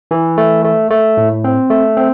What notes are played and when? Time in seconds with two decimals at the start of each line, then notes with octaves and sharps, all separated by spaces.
0.11 E3
0.38 A3
0.65 A3
0.90 A3
1.17 A2
1.44 C4
1.70 A3
1.97 C4